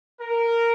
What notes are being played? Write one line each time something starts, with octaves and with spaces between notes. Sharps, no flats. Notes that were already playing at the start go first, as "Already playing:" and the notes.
A#4